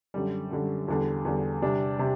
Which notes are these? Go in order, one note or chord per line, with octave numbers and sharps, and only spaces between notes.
F#2 D3 G3
F#2 D3 G3
E2 D3 G3
E2 D3 G3
C3 G3 D4
C3